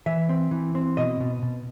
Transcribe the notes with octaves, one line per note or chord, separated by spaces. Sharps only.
E3 E5
C4
E3
C4
B2 D#5
B2
B2